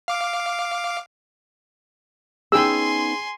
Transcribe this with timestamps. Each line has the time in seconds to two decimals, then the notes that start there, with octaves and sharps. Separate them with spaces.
0.08 F5 D6
2.52 B3 C#4 D#4 G#4 G5 G#5 C6 E6